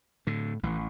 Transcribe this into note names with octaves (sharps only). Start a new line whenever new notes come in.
A2 D3
A1 E3